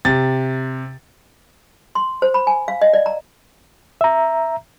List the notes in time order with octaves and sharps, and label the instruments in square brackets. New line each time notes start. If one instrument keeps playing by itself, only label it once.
[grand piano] C3 A6
[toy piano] C6
C5
B5
G#5
F5
D#5
D5
A#5
[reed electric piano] E5 A#5